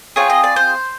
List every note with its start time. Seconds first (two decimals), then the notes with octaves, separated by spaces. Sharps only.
0.16 C4 F4 G#4 C#5
0.30 D#5
0.44 D5
0.56 C5